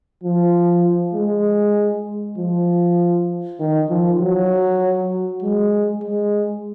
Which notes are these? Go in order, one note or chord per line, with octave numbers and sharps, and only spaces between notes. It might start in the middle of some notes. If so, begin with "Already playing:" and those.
F3
G#3
F3
D#3
F3
F#3
G#3
G#3